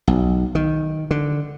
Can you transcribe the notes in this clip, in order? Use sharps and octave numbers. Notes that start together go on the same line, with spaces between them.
B1
D#3
D3